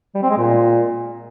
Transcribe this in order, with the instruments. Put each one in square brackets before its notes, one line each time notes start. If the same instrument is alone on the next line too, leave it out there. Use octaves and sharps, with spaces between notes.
[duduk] G3
C4
G#3
A#2